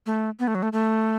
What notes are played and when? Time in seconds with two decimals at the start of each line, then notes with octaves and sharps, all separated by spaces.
0.06 A3
0.40 B3
0.48 A3
0.55 F#3
0.63 A3
0.73 A3